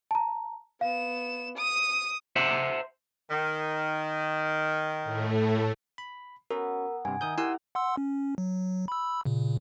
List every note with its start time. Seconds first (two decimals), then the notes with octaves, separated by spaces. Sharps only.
0.11 A5 A#5
0.81 B3 F5 E7
1.58 D#6 D#7
2.36 C5 E5 F#5
3.31 D#3
5.04 A2 A3
5.98 B5
6.50 B3 C#4 F#4 A#4
7.05 G2 C3 G#5
7.21 D#3 D#4 E5 D#6 G6
7.38 E4 G4 A#4 F#5 G#5 C6 E6
7.75 F#5 C6 E6
7.97 C#4
8.38 F#3
8.88 B5 E6
9.25 A#2 C#3